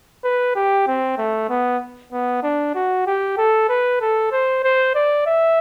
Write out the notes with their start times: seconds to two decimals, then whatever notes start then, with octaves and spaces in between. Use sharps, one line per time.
0.24 B4
0.55 G4
0.87 C4
1.18 A3
1.49 B3
2.12 B3
2.43 D4
2.75 F#4
3.06 G4
3.38 A4
3.69 B4
4.01 A4
4.32 C5
4.64 C5
4.95 D5
5.26 E5